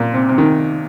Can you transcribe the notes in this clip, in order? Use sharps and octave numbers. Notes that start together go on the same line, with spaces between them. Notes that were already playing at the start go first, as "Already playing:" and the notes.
Already playing: A#2
C3
C3
D#3